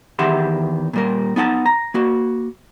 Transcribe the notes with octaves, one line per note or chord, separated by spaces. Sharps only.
E2 D#3 G4 E5 F#5 C6
A#2 G3 A#4
B3 D#4 F#5 G5 A5
A#5
A#3 F#4